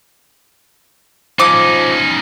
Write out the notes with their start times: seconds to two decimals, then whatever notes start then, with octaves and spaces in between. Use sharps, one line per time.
1.39 F3 C#4 D#4 D6 D#6